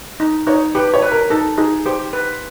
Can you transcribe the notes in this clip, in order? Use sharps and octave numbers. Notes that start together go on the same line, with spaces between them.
D#4
D#4 C#5
G4 B4
C#5
B4
A#4
D#4 A4
D#4 G#4
G4 C5
B4